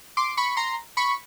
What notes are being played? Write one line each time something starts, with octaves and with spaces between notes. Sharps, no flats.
C6 D6
B5 C#6
A#5 C6
B5 C#6